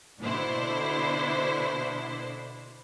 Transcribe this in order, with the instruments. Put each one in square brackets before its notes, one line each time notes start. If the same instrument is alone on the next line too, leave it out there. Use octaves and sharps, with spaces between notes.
[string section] B2 D3 D4 E4 C5